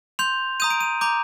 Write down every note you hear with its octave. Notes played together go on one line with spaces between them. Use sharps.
C6 G6 F7
A#5 D#6 G6 D#7
D7
D#7
A#5 D6 G6